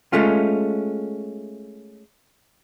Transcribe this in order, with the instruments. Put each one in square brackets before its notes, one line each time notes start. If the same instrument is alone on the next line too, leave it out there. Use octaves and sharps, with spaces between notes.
[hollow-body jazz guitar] G#3 A3 C#4 F4